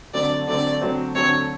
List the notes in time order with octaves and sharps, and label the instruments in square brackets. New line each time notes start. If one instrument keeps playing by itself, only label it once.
[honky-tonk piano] D3 F#3 A3 C4 [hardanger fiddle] D5
[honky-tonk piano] D3 F#3 A3 C4 [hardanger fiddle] D5
[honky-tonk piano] D3 F#3 A3 C4
[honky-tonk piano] D3 F#3 A3 C4 [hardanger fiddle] C#5